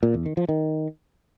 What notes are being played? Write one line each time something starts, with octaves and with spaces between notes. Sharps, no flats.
A#2
E2
D#3
F3
D#3